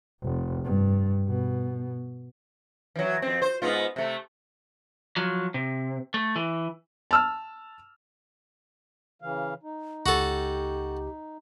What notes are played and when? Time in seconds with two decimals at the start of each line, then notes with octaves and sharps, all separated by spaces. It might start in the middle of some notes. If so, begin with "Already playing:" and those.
0.23 F1
0.64 G2
1.28 B2
2.96 E3 F#3
3.22 F2 C4
3.42 C5
3.62 G#2 B3 F4
3.96 C3 A3
5.17 F3 F#3
5.54 C3
6.14 A3
6.36 E3
7.11 A5 E6 F6
9.22 C#3 E3 F5
9.63 D#4
10.06 C#2 F#4 G4 A4